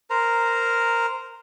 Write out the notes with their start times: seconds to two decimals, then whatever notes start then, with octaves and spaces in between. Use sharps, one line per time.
0.10 A#4 C5 A#5